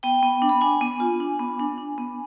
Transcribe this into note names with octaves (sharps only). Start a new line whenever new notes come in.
B3 G5
B3
D4
B5
D4 G#5
B3
F4
D4
B3
D4
D4
B3